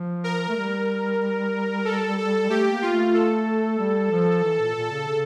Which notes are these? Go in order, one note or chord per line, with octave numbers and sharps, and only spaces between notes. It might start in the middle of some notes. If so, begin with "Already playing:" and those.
Already playing: F3
A#4
A3
G3
A4
A4
A3 G4
A#3
F4
A3
A4
G3
F3
E3
A#2
A#2
C#3
C#3